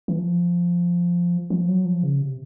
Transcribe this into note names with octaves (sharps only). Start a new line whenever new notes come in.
E3
F3
F3
F#3
F3
C#3
C3